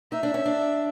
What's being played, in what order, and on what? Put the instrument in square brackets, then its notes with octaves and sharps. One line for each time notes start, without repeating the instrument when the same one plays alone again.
[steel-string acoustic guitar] D#4 [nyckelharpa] E5
[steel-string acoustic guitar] D4
C#4
D4